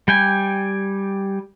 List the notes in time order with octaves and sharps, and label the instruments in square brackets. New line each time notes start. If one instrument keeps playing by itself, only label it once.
[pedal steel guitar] G3 G5 G#5